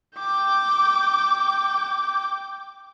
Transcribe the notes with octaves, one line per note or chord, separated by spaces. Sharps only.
G5 D6